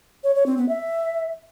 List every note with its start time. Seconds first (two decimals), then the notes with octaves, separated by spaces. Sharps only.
0.24 C#5
0.35 C#5
0.46 C4
0.57 B3
0.69 E5